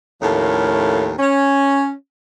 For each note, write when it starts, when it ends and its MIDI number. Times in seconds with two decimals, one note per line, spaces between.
0.22 1.13 39
0.22 1.13 45
0.22 1.13 53
0.22 1.13 57
0.22 1.13 58
0.22 1.13 61
1.18 1.91 61